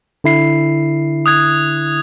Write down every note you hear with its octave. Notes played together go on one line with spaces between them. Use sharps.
D3 E4 C7
D#6 F#6 G#6